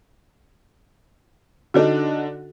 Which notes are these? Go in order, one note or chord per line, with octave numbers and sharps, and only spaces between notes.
D3 D4 D#4 F#4 A4